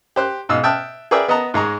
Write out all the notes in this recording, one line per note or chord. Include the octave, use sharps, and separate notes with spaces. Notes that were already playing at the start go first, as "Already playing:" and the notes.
G4 C5 F#6
G#2 B2 F5 E6
E5 G5 A5 D#6 F6 F#6
G#4 A#4 B4 D5 E5 G5
B3 D#5 F#5 A5 A#5
G#2 G#3 A#5 C#6